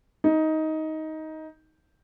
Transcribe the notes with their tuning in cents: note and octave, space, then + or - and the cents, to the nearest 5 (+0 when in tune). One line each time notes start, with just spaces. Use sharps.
D#4 +15